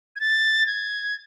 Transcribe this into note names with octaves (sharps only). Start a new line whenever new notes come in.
G#6
A6
G#6